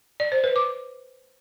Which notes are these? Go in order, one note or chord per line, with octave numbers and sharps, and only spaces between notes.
D5
C5
B4
D6